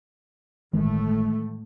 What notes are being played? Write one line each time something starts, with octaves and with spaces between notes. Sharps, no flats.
G1 A2 D#3 E3 G#3 A3